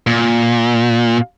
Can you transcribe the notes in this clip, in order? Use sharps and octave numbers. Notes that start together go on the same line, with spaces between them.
A#2